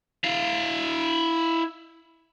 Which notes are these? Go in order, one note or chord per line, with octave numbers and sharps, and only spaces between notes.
E4 F5